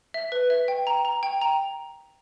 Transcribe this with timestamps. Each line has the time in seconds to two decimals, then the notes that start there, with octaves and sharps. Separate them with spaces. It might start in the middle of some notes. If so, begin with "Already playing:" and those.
0.14 E5
0.32 B4
0.50 E5
0.68 G5
0.87 A#5
1.05 A#5
1.23 G5
1.41 A#5